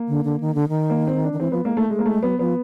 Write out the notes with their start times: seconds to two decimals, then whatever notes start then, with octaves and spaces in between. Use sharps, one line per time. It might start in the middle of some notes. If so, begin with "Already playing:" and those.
Already playing: A#3
0.08 D3
0.25 D3
0.40 D#3
0.55 D3
0.69 D#3
0.90 A#3
1.07 C4
1.24 D4
1.33 D#3
1.40 E3 C4
1.52 F3 B3
1.65 G#3 A#3
1.77 A3 A#3
1.90 G#3 A3
1.99 A#3
2.06 G#3 A3
2.22 F#3 B3
2.39 F3 B3